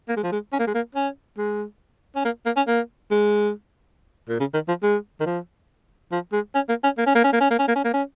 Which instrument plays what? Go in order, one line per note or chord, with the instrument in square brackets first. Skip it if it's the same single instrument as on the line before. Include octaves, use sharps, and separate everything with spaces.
[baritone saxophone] A#3
G#3
F3
G#3
C#4
A#3
G#3
A#3
C#4
G#3
C#4
A#3
A#3
C#4
A#3
G#3
A#2
C#3
D#3
F3
G#3
D#3
F3
F3
G#3
C#4
A#3
C#4
A#3
C#4
A#3
C#4
A#3
C#4
A#3
C#4
A#3
C#4
A#3
C#4